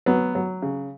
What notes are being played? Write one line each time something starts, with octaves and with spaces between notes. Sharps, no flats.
F#3 B3
F#3
C#3